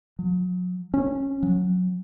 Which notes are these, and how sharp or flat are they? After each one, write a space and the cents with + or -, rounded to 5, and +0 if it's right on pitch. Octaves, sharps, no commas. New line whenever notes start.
F#3 -35
C#4 -15
F#3 -20